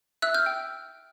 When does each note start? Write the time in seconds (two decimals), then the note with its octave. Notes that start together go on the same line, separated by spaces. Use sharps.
0.22 E5 E6 F#6
0.34 F6 G6
0.46 G5